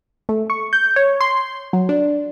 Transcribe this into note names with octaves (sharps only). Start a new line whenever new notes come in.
A3
C#6
G6
C#5
C6
F#3
D4